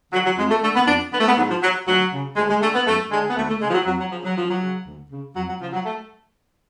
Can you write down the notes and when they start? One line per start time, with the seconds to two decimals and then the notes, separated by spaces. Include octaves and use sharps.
0.12 D3 F#3
0.25 F#3
0.37 F2 G#3
0.50 A3
0.62 D3 A3
0.75 B3
0.87 F2 D4
1.12 D3 B3
1.20 A3
1.27 B3
1.36 G#2 F#3
1.49 F3
1.62 F#3
1.87 D2 F#3
2.12 C#3
2.36 D2 G#3
2.49 G#3
2.61 D3 A3
2.74 B3
2.87 F#2 A3
3.11 D3 G#3
3.29 B3
3.36 D2 A3
3.49 A3
3.61 C#3 G#3
3.69 F3
3.74 F#3
3.86 F2 F#3
3.99 F#3
4.11 C#3 F3
4.24 F#3
4.36 F#2 F3
4.48 F#3
4.61 C#3
4.86 D2
5.10 C#3
5.36 F2 F#3
5.48 F#3
5.60 C#3 F3
5.73 F#3
5.86 A3